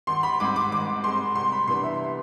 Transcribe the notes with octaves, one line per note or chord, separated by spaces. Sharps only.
G#1 C6
B5
G#2 G#3 C4 D6
D6
G#1 D6
G#2 G#3 C4 C6
C2 C6
B5
C3 E3 B3 D4 C6
E5